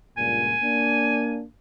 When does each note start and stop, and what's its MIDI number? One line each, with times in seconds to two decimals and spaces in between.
0.17 0.55 37
0.17 0.55 43
0.17 0.55 46
0.17 1.37 80
0.63 1.44 58
0.63 1.44 62